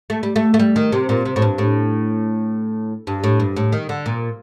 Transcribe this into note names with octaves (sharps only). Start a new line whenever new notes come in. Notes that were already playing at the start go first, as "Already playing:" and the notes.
A3
G3
A3
A3
G3
D#3
C3
A#2
C3
A2
G2
A2
G2
A2
G2
A2
D#3
D3
A#2